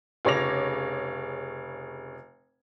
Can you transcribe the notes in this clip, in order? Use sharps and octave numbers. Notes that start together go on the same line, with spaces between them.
F1 C#3 C#5 D6 A#6 F7